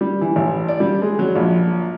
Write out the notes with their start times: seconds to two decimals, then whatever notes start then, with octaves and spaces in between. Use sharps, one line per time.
0.01 G3
0.21 E3
0.36 A1
0.68 D5
0.80 G3
1.02 G#3
1.19 F#3
1.36 A#1